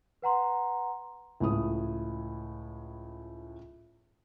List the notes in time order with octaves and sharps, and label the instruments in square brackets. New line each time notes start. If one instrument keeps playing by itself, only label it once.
[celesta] B4 F#5 A#5 C6
[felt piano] C#2 A2 D#6